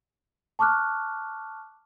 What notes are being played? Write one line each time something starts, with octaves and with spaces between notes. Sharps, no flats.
A5 C#6 D6 F6 F#6